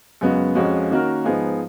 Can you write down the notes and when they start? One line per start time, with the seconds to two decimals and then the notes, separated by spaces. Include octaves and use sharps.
0.21 F#2 C#3 G#3 B3 F#4
0.55 F2 F3 G#3 C#4 F#4
0.91 D#3 A#3 C#4 F#4 A#4
1.25 G#2 F3 B3 D#4 G#4